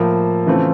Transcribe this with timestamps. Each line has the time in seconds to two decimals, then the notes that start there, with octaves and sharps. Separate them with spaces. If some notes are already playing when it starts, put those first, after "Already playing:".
Already playing: A2 F3 A#3
0.46 C#3 E3 A3 C4 F4